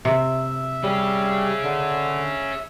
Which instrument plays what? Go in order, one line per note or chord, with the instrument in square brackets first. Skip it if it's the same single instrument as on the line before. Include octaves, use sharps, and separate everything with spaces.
[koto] C3 [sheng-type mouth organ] E5
[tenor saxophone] G3 [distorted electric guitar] G#4 C#5
[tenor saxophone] D3